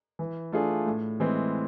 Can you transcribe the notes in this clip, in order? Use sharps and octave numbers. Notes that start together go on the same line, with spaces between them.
E3
A3 D4 F4 G#4
A2
E3 G#3 C4